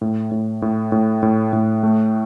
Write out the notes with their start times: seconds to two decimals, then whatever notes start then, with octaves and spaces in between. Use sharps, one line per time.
0.01 A2
0.31 A2
0.62 A2
0.92 A2
1.23 A2
1.53 A2
1.83 A3